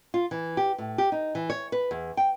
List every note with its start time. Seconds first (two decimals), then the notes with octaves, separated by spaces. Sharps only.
0.14 F4
0.31 E3
0.57 G4
0.78 A2
0.98 G4
1.12 D#4
1.35 E3
1.50 C#5
1.72 B4
1.91 E2
2.17 G5